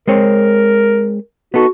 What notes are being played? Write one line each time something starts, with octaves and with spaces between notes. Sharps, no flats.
G#3 C4 A#4 C#5
B3 D#4 F#4 A4